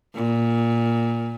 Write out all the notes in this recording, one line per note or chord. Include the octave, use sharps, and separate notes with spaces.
A#2